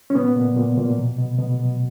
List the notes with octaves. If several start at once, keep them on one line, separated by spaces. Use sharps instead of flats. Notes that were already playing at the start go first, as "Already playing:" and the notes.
C#4
A#2 B3
A#2
A#2
A#2
B2
B2
B2
B2